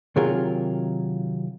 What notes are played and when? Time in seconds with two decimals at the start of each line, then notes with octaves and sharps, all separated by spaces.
0.16 C3 D#3 F#3 F4 G#4 A#4